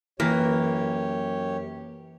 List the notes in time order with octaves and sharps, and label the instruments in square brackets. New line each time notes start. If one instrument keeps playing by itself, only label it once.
[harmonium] F#2 G4 C#5 [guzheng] E3 [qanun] A#3